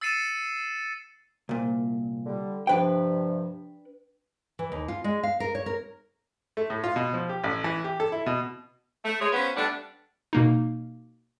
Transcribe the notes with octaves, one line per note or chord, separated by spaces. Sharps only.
E6 A6 C7 C#7 D#7 E7
C2 A#2
D3 G3
G2 C3 F3 D4 B4 G5
E3
D#2
F4
G#3
F5
A#4
C#5
A#4
A3
A2
F4
B2
F3
G4
A1
E3
G4
A4
E4
B2
A3
G#3 G#4 C#5
B3 C#4 F4 B4 C5 F#5
G3 A3 B3 D4
B2 A#3 D#4